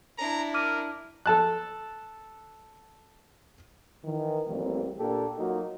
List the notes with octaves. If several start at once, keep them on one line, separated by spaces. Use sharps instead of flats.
D4 E4 A#5
A#4 D6 F6 D#7
A4 A5 F#6
D#3 E3
A1 F2 A2 G3 A#3 C4
A#2 A#3 D4 G4 A4
F#3 A#3 D#4 F4 F#4